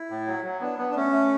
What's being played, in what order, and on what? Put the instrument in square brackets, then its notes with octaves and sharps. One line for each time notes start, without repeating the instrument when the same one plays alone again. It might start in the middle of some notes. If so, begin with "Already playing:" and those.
Already playing: [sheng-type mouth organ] E4
[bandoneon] A2
F#3
F#3
[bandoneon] B3 [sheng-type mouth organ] D4
[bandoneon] B3
[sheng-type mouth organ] D4
[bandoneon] A3 [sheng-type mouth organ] C#4
[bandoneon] A3